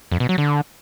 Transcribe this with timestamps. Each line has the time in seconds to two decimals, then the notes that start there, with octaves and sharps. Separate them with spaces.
0.12 F2
0.20 B2
0.29 F#3
0.38 D3